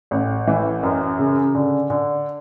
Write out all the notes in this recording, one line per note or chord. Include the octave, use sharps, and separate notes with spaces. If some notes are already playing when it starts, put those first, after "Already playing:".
A1
E3
F#2
C#3
D3
D3